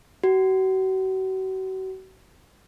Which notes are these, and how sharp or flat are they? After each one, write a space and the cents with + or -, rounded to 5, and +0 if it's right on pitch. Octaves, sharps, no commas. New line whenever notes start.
F#4 +40